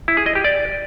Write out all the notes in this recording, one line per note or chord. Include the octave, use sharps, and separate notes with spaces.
E4
G#4
D#5
G4
D5